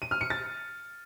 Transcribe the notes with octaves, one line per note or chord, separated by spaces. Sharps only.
D#7
F6
C#7
A6